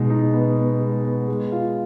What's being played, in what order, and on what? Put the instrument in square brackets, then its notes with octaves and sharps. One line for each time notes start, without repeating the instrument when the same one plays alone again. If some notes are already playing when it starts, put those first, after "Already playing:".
Already playing: [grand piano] B2 G#3 D#4
D#4
B3
B3
G#3
B3
G#3
F4